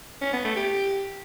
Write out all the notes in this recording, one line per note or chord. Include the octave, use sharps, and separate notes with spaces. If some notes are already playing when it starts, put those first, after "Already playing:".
C#4
B3
A3
G4